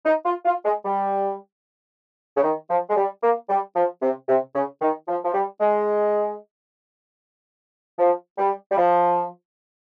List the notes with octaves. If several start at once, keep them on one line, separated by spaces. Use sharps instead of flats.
D#4
F4
F4
G#3
G3
C#3
D#3
F3
G#3
G3
A#3
G3
F3
C3
C3
C#3
D#3
F3
F3
G3
G#3
F3
G3
G3
F3